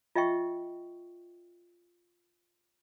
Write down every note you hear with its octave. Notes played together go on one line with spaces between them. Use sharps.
F4 D#5 E5 G5 C#6